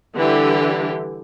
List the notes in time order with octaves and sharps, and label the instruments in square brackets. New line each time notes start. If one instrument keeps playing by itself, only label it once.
[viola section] D3 E3 G3 G4